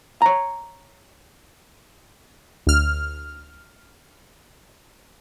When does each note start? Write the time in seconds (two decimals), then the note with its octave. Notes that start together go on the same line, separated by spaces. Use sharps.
0.22 C#5 A#5
2.67 D2 F6